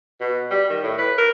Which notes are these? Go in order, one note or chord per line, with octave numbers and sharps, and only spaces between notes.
B2
G3
D#3
A2
B4
A#4